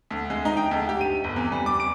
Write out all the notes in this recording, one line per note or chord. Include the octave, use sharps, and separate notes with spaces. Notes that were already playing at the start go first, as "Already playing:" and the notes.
D2
G#3
D#4
G5
D2
G4
D#7
G1
E2
G3
D6
D7